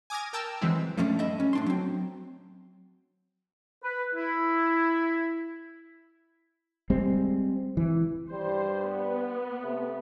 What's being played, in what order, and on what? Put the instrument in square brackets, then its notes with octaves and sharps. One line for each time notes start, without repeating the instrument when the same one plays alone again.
[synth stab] G#5 D6 D#6 F6 G#6 A#6
A#4 G5 A5 A#5 E6 F6
E3 F#3 G#3 C4 E4
[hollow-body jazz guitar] F2 A#2 F3 A3 C#4 D4
G2 D#5 E5 B5
C#4
A2 D4 C6
F#3 C4
[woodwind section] B4
E4
[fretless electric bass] G3 G#3 C4
E3
[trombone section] G2 G3 [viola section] C5
[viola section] B3
[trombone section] C3 A3